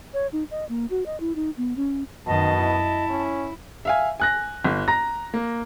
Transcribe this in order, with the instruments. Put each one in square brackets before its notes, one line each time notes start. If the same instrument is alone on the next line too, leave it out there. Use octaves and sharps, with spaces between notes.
[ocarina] C#5
D#4
D#5
A#3
F#4
D#5
E4
D#4
B3
C#4
[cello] F#2 D#3 [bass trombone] B2 [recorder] D#5 [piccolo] A5
[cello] E4
[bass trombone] C#4
[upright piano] E5 F5 G#5
G#5 F#6 A#6
G1
A#5 A#6
A#3